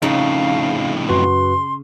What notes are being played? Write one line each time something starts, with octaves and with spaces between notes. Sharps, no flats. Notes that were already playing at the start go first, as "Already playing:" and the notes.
F2 A2 C#3 D#4 F5
F#2 F#4 B4 C6